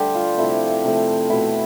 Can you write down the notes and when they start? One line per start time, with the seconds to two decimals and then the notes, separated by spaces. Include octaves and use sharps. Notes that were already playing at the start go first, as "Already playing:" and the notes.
Already playing: D3 G3 A3 G4 A4 C5 D5
0.15 F4
0.37 C3 F3 A3 E4
0.84 C3 F3 A3
1.30 B2 A3 E4